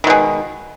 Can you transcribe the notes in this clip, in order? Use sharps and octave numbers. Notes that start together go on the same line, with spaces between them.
B2 D#3 G#3